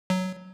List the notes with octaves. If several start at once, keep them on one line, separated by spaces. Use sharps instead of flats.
F#3